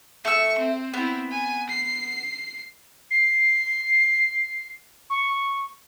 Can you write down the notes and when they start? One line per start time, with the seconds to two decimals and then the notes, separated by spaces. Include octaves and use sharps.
0.25 A3 C#6 E6
0.58 C4
0.94 B3 C4 E4
1.31 G#5
1.69 C7
3.11 C7
5.10 C#6